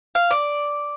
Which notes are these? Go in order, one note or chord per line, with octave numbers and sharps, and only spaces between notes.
F5
D5